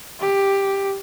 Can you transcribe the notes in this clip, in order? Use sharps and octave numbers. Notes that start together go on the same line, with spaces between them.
G4